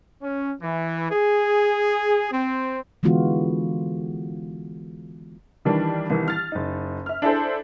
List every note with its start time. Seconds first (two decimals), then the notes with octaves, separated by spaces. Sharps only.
0.22 C#4
0.62 E3
1.11 G#4
2.32 C4
3.03 D3 E3 G#3 B3 F4 F#4
5.65 D#3 E3 G3 D4
6.10 C2 D#3 E3
6.28 F6 A6
6.52 F#1 D#4
7.06 E5 F6
7.22 D4 E4 G#4 A4 C5